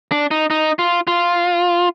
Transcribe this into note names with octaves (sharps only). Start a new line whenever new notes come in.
D4
D#4
D#4
F4
F4